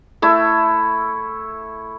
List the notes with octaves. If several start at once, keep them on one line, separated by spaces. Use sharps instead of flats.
A3 E4 E5